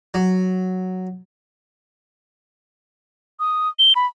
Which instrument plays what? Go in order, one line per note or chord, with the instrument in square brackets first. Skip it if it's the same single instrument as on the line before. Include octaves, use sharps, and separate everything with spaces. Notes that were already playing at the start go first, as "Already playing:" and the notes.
[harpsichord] F#3
[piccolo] D#6
G7
B5